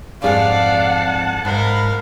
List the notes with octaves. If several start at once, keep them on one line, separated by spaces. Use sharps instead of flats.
F2 G#2 G#4 D5 F5 F#5 A5
G#2 A#4 F5 B5